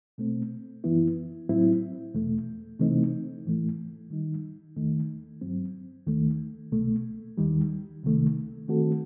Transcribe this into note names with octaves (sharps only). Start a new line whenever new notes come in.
B2 A3 C4
F#2 E3 B3 E4
A2 F#3 C4 E4
E2 B2 A3
C3 E3 A3 C4 D#4
A2 E3 A3
D#3 G3 D#4
E2 D#3 A3 D#4
G2 F#3 C4
D#2 D#3 A3
C2 B2 A3
D#2 D#3 G3
C2 C3 D#3 A3
D#3 A3 C4 F#4 A4